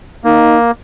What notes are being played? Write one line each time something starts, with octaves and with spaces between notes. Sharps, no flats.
A#3 D#4